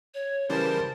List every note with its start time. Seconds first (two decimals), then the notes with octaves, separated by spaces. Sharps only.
0.14 C#5
0.50 C#3 E3 G3 A#4 C5 A5